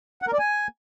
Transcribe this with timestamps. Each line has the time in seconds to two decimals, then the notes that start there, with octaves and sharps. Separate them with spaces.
0.22 F#5
0.28 A#4
0.33 D5
0.39 G#5